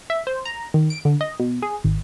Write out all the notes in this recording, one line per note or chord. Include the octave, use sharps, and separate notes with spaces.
E5
C5
A#5
D#3
D7
D3
D#5
B2
G#4
G#1